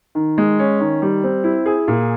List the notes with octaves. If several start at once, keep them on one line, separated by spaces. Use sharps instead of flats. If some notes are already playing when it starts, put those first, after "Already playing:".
D#3
G#3
C#4
D#3
G3
C4
E4
G#4
A#2